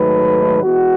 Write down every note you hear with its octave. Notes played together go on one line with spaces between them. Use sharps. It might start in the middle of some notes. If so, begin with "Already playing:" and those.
Already playing: G#2 D#3 F#3 A3 B4
E3 G#3 B3 F#4